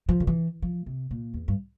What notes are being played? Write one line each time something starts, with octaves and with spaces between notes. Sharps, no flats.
F3
D3
E3
F3
C3
A#2
E2
G2